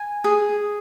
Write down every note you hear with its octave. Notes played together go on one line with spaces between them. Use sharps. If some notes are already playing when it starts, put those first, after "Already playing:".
Already playing: G#5
G#4